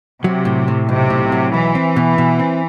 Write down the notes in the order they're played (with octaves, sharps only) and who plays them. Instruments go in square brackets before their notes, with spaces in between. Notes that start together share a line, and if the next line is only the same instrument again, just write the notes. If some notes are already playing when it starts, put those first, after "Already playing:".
[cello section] C3 [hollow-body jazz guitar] F#3
[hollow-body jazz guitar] A2
A2
[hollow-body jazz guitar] B1 [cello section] C3
[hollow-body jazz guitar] A2
F#3
[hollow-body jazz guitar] B1 [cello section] E3
[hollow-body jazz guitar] C4
B2
B2
C4